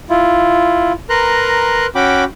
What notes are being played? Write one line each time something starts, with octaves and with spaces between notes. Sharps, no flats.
E4 F4
A#4 B4 A#5 C6 F#6
C#4 F#4 G5 B5 D6